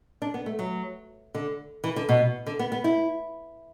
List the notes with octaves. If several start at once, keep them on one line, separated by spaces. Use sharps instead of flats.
D4
B3
A3
F#3
D3
E3
D3
B2
D3
B3
B3
E4